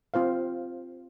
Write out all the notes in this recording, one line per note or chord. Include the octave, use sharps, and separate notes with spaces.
C4 F4 C5 F5